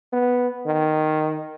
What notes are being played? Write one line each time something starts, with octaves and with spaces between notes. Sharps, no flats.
B3
D#3